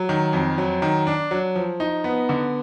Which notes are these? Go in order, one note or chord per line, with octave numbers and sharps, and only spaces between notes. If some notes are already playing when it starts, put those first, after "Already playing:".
Already playing: F#3
D#3
F2
F#3
D#3
D4
F#3
F3
D#4
B3
D3